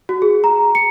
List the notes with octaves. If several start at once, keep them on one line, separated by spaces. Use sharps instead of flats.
F#4
G#4
A#5
C#7